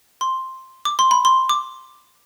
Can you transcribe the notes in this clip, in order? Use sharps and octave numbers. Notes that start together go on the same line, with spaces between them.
C6
D6
C6
B5
C6
D6